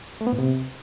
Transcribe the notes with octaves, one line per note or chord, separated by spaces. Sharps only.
A3
B3
A2
C3